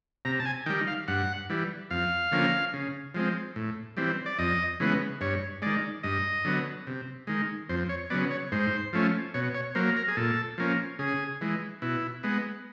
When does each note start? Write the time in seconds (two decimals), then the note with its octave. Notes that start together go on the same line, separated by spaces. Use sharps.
0.25 C3 A#5
0.40 A5
0.45 G#5
0.66 D#3 G5
0.70 G3
0.87 F5
1.08 G2 F#5
1.50 E3 G3
1.90 F2 F5
2.32 D3 F3 A#3 C#4
2.74 C#3
3.14 F3 G#3 C4
3.56 A2
3.97 E3 G3 C4
4.26 D5
4.39 F2 D#5
4.80 C#3 E3 G#3 B3
5.21 G2 C#5
5.62 D#3 G#3 D5
6.03 G2 D#5
6.45 D3 F#3 B3
6.87 C3
7.27 D#3 G#3
7.69 F2 C5
7.89 C#5
8.10 C#3 F#3 B3 D5
8.31 C#5
8.52 G#2 C5
8.93 F3 A3 C#4
9.34 B2 C#5
9.55 C#5
9.75 F#3 A#3 C5
9.96 A#4
10.08 G#4
10.17 A#2 A4
10.58 F3 A#3 C#4
10.99 C#3 G#4
11.41 E3 G#3
11.82 B2 E4
12.23 G#3 B3